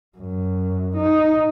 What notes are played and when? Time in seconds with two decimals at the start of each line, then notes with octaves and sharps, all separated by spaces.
0.18 F#2
0.97 D#4